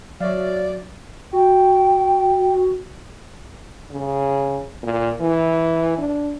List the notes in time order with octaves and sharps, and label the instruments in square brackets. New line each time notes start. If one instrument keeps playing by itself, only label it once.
[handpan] F#3 [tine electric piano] C#5 E5 F5 [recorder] D5
[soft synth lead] F#4 [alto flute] G5
[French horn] C#3
A#2
E3
D4